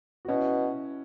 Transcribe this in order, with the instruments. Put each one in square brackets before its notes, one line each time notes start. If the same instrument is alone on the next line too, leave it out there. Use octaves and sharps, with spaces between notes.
[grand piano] F#4
[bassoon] B2 [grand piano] C#4 E4